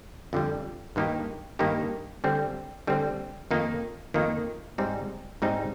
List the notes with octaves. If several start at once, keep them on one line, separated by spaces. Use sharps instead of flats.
F2 D3 G3
G2 D#3 A#3 D#4 G4
G2 D#3 A#3 D#4 G4
D3 G3 C4
D3 G3 C4
F2 D#3 A#3 D#4
F2 D#3 A#3 D#4
G#2 G3 C4 D#4
G#2 G3 C4 D#4